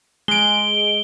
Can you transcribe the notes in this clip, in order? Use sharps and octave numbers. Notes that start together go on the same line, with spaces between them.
G#3 D7 G7